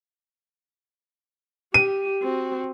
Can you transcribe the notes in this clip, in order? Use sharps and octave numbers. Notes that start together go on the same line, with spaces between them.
G4 D#7
C4 F#4